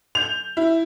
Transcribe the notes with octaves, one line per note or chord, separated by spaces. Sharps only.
G6 F7
E4